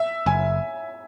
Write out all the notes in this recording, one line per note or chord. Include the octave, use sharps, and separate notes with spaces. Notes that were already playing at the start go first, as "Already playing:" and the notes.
Already playing: E5
F#1 G#5